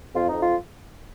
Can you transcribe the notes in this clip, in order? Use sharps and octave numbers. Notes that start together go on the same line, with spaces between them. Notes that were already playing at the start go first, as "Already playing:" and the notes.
F2 F4
F2 D#4
F4